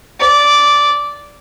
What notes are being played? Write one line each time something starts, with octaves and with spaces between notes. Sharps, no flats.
D5